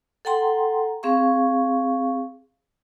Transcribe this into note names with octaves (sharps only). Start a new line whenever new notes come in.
A4 F#5 G5 A#5 C6
C4 G#4 F5 C#6